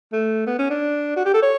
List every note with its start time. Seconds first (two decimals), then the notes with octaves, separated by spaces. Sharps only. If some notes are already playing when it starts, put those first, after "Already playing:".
0.13 A3
0.47 B3
0.59 C#4
0.70 D4
1.17 F#4
1.25 G4
1.34 A4
1.43 C#5